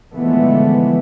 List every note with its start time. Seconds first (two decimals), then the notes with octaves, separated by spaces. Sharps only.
0.14 D3 E3 F3 G#3 A3 B3